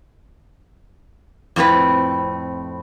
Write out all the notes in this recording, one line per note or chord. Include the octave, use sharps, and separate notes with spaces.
F2 A2 C4 B4